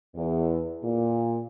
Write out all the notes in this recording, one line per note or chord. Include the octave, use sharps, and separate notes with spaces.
E2
A#2